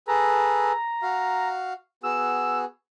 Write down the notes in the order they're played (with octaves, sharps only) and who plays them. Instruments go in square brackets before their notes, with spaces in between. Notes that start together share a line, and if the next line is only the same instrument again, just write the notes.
[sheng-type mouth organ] G#4 A4 B4 [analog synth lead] A#5
[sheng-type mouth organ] F#4 F5
[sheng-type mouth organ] B3 F#4 G#4 [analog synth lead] E6